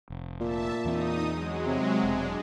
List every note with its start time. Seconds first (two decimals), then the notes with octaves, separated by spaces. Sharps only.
0.10 F1
0.41 A#2 E5 A5
0.85 E2 E3 C4 D#4 D#6
1.31 F#3 G#3
1.66 C3
2.04 E1 G#3 D4